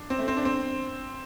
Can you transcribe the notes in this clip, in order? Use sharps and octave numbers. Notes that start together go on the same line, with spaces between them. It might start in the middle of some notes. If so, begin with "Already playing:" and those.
Already playing: D4
C4
A3
C4
D4
C4